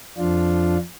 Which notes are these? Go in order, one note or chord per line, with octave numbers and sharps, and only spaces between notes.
F2 F3 D4 F4